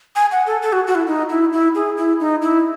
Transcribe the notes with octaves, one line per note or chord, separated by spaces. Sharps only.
G#5
F#5
A4
A4
F#4
F#4
E4
D#4
E4
E4
G#4
E4
D#4
E4